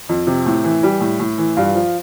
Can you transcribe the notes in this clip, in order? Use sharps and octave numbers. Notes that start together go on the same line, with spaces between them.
F2
C3
A2
E3
G3
A2
A2
E3
G2 F4
F3